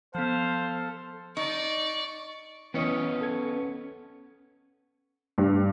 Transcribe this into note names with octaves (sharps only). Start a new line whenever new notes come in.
F3 B3 A4 C5 F5
D#4 D5 C#6
E3 B3 C#4 C#5 D#5 D#6
A4 G#6
G2